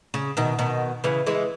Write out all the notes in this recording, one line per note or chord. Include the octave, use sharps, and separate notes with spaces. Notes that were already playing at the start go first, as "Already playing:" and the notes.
C#3
B2 D#3
B2 D#3
C#3 E3
E3 G#3